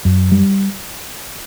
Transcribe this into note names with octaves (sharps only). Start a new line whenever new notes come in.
F#2
G3